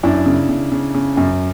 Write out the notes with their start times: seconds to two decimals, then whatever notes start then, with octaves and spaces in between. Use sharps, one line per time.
0.03 F#2 D4 E4
0.26 C#3
0.49 C#3
0.72 C#3
0.94 C#3
1.17 F#2